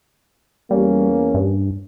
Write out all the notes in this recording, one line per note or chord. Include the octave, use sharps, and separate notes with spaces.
E2 G3 A#3 C#4
G2